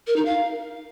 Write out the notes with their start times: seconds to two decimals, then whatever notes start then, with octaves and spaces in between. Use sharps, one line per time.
0.07 A#4
0.16 D#4
0.25 F5